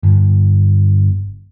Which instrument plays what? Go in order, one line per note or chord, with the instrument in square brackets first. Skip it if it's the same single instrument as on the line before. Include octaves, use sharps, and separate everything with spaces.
[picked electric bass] G1